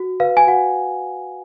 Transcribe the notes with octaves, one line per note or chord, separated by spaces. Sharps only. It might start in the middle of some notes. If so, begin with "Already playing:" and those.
Already playing: F#4
B4 F5
G#5
F#4 F#5